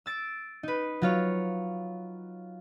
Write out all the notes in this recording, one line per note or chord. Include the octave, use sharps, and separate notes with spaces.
E6 A6 D7
D#4 B4
F#3 F4 C#5